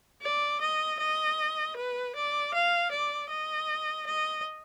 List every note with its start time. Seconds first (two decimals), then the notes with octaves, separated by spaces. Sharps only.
0.22 D5
0.61 D#5
0.99 D#5
1.76 B4
2.15 D5
2.54 F5
2.91 D5
3.30 D#5
4.07 D#5